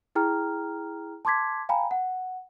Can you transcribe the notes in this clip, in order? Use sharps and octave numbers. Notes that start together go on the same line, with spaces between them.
E4 G#4 G5 A#5 F6
A5 C6 D6 G#6 B6
F5 G5 G#5 A#5 B5
F#5